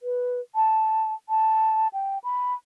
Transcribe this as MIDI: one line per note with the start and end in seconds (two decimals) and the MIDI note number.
0.01 0.40 71
0.55 1.13 81
1.29 1.88 81
1.93 2.18 79
2.24 2.54 83